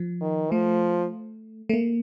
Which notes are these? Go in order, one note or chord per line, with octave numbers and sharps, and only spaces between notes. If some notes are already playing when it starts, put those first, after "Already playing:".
Already playing: F3
D#3
F3 A3
A3
A#3